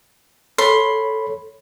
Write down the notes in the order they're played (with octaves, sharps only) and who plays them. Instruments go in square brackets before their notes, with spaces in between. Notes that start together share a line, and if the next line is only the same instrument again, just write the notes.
[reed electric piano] A4 C#5 B5 [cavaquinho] C6